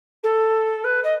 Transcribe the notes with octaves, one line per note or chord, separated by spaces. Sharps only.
A4
B4
D#5